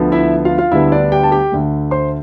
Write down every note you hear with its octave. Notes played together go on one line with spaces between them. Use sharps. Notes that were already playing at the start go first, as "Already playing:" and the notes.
Already playing: D2 D3 F3 B3
E4 E5
F4 F5
F4 F5
D2 D3 G3 B3 E4 E5
D4 D5
G4 G5
A5
G4 G5
D2 D3 A3
C5 C6